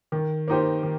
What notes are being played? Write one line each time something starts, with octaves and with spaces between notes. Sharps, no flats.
D#3
A#3 D#4 G4 C5
D#3